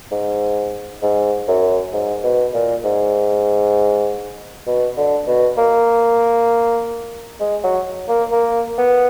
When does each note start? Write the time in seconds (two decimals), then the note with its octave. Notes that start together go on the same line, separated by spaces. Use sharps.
0.11 G#2
1.02 G#2
1.48 F#2
1.93 G#2
2.24 B2
2.54 A#2
2.84 G#2
4.67 B2
4.97 D3
5.27 B2
5.57 A#3
7.40 G#3
7.63 F#3
8.08 A#3
8.31 A#3
8.78 B3